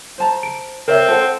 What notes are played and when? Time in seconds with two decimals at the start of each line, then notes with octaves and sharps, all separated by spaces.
0.18 C5 A5 A#5
0.43 D7
0.88 C4 A#4 C#5 E5
1.08 A4 C5 F#5